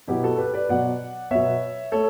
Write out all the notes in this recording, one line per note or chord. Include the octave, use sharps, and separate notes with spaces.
B2 F#3 B3 E4 G4
F#4 A4
G4 B4
B4 D5
B2 F#3 B3 D5 F#5
B2 F#3 B3 C#5 E5
A3 A4 C#5